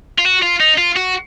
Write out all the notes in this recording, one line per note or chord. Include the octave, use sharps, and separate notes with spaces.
F4
F#4
F4
D#4
F4
F#4